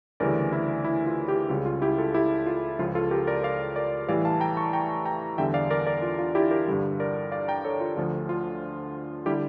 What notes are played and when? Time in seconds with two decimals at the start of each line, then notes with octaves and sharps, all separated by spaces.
0.20 D2 C#3 E3 G3 A#4 D5
0.52 E4
0.84 E4
1.06 F4
1.28 E4 G4
1.49 C#2 C#3 G3 F4
1.65 F4
1.82 E4 G4
1.98 F4 A4
2.14 E4 G4
2.46 F4
2.79 C#2 C#3 F3 F4
2.95 F4 A4
3.11 G4 A#4
3.27 A#4 D5
3.43 D5 F5
3.76 A#4 D5
4.08 A2 E3 G3 D5 F5
4.25 F5 A5
4.40 G5 A#5
4.57 A5 C#6
4.73 G5 A#5
5.05 G5 A#5
5.38 E2 D3 G3 E5 G5
5.54 D5 F5
5.70 A#4 D5
5.86 A#4 D5
6.02 F4
6.19 F4
6.35 E4 G4
6.51 G4 A#4
6.68 G2 D3 G3
7.00 A#4 D5
7.32 D5 F5
7.48 G5 A#5
7.65 A4 C#5
7.80 F4
7.97 D2 D3 F3 F4
8.29 F4
9.26 D3 G3 E4 G4